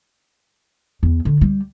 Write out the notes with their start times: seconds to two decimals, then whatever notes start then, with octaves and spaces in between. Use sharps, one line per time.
1.03 E2
1.25 D3
1.41 G3